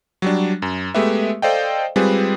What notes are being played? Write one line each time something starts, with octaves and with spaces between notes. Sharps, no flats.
F#3 G3 D4
F#2
G#3 A3 B3 G4 B4 E5
A4 C5 D5 D#5 F5 G5
G3 G#3 C4 F4 G#4 B4